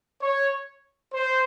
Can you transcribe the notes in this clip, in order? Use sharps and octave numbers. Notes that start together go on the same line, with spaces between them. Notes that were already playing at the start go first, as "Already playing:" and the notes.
C#5
C5